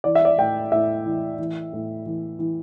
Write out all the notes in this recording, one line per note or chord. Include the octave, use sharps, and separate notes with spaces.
E3 D5
E5
D5
A2 G5
A2 E5
E3
E3
A2
E3
E3